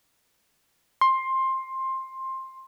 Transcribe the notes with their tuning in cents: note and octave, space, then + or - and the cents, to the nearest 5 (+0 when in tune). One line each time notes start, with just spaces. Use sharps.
C6 +15